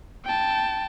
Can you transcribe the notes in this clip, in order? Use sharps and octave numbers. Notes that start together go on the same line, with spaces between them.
G5 A5